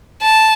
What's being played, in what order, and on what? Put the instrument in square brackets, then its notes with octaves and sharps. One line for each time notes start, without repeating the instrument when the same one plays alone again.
[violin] A5